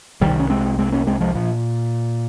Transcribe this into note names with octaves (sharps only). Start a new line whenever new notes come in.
C2 C3 D#3 G3
C#4
G#3 C4
G#3 C4
A#3 C#4
G#3 C4
F3 G#3
A#2 F3